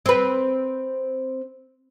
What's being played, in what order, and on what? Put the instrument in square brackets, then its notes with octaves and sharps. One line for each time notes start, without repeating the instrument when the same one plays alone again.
[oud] C4 B4